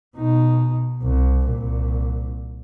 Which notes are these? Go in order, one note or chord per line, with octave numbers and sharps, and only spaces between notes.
B2 D#4
C2
C2 A#2